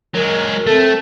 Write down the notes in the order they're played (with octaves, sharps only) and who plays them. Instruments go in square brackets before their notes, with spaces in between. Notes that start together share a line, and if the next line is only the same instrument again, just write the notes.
[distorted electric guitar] F#3 G#3 [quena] A#4
[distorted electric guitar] A3 [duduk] C4 [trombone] A4